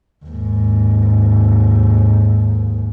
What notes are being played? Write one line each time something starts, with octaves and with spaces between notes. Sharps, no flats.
D#2 G#2